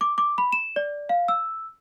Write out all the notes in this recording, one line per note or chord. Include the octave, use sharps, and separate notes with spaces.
D6
D6
B5
E7
D5
F5
E6